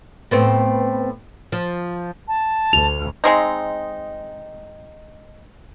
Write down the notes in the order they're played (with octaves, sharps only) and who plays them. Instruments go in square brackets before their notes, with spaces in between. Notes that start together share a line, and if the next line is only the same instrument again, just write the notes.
[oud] A2 B3 C4
F3
[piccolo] A5
[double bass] D2 [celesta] F7
[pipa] G#3 C4 D#4